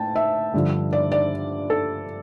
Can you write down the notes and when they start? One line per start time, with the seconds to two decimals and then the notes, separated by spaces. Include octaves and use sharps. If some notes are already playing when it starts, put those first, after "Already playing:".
Already playing: A2 G5 A5
0.15 E5
0.54 G2 D3 F3
0.93 D5
1.12 D5
1.70 A4